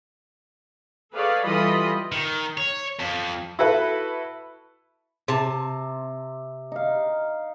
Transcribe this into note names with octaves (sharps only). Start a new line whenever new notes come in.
G#4 A4 B4 C#5 D5 F5
E3 G3 F4 A4 D#5 B5
D#3
C#5
F2
E4 F#4 A4 B4
C3 A5
D#4 F5